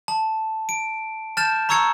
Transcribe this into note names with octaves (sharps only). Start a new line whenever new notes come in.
A5
D7
A5 F6 G6 A6 E7
A#5 C#6 E6 G#6 C#7